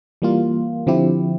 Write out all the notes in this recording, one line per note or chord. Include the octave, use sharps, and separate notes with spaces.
E3 G3 A#3 F4
D3 F3 C4 E4 G4